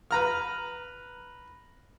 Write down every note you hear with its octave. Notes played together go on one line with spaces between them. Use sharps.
B4 A#5 F6